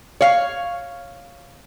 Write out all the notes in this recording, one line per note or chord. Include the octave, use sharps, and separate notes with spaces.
C#5 F5